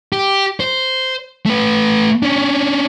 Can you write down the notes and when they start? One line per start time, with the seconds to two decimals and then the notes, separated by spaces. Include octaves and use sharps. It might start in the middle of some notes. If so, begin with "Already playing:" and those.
0.13 G4
0.60 C5
1.46 A3 B4
2.23 C#4 D4